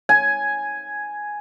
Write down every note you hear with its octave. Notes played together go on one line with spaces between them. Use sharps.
G#5